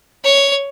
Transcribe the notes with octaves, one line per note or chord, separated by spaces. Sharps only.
C#5